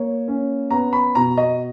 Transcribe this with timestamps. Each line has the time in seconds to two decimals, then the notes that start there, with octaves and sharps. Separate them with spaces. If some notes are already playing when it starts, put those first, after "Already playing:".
Already playing: A#3 C#5
0.28 C#4
0.71 B3 A#5
0.93 B5
1.15 B2 A#5
1.38 D#5